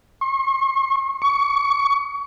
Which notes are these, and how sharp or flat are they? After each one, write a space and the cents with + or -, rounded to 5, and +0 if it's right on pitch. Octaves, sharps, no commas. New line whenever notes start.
C#6 -45
C#6 +25